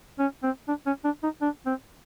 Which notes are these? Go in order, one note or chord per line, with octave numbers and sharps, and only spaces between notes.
C#4
C4
D4
C#4
D4
D#4
D4
C4